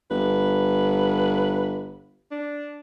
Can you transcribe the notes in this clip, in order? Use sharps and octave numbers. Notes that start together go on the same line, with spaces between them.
G1 B4
D4